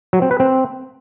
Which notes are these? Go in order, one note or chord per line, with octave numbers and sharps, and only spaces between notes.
F#3
C4
B4
C4